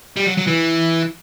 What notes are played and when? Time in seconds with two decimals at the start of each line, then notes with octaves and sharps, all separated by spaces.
0.17 G3
0.27 F#3
0.37 F#3
0.47 E3